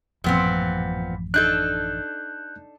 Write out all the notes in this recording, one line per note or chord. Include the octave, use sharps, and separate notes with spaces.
A1 F#2 A#2 F3 B3 C4
D4 D#4 A4 F#6 G6